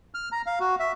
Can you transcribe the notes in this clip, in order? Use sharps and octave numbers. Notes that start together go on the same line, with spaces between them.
F6
A#5
F5
F#4
E5